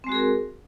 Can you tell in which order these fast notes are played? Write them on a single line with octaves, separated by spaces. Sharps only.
C4 G#3 F#4 G#4 A#4